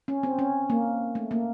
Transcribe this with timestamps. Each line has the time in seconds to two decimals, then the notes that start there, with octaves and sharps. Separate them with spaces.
0.08 C#4
0.23 C4
0.39 C#4
0.70 A#3
1.15 A3
1.31 A#3